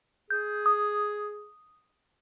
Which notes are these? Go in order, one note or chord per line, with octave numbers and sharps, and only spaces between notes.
G#4 G6
D#6